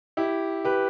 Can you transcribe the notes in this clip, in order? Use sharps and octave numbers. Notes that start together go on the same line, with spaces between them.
E4 G4
G4 B4